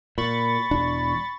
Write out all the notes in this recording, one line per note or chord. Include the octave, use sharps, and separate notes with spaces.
A#2 B5 C#6 A6
E1 D4